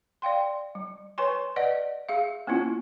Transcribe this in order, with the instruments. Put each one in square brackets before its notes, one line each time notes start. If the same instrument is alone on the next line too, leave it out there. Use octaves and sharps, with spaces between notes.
[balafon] D5 F5 G5 C6
G3
B4 C#5 G#5 C6 C#6
B4 D5 D#5 F#5
G#4 E5 F5
A#3 B3 C#4 E4 F4